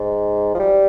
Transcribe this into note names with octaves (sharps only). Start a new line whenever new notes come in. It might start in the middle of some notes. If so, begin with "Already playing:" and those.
Already playing: G#2
F3
G3